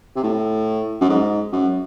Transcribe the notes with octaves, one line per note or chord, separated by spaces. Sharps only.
C3
A2
F#2
G#2
F#2